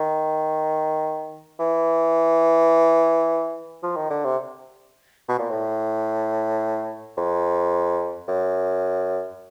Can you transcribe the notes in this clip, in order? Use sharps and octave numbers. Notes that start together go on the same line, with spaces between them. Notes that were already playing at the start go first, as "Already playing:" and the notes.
Already playing: D#3
E3
F3
D#3
D3
C3
B2
A#2
A2
F2
F#2